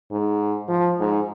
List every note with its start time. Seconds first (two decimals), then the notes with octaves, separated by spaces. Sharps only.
0.12 G#2
0.68 F3
1.00 G#2